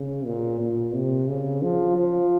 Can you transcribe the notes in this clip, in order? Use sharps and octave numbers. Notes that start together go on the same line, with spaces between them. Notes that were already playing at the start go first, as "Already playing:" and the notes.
Already playing: C#3
A#2
A#2
C3
C#3
F3
F3